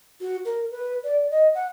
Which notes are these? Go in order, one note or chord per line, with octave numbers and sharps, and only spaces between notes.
F#4
A#4
B4
D5
D#5
F#5